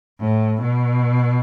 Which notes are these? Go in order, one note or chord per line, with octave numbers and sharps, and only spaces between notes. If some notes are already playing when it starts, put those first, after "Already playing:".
A2
B2